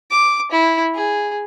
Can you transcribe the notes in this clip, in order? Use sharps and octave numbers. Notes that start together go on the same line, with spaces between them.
D6
E4
G#4